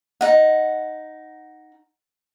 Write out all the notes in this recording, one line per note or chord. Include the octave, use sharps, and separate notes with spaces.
D#4 F#5